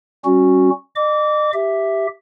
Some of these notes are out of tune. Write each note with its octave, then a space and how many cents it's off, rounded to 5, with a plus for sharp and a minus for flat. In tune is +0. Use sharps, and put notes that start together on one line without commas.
G3 -30 C#4 -15 F#4 -5
D#5 -40 D6 -20
G4 +0 E5 +0